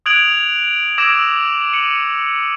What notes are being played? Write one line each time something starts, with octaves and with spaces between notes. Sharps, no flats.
D#6 F#6 G#6 D7 F7 F#7
D6 E6 G#6 A#6 D7 E7
C#7 D#7 F#7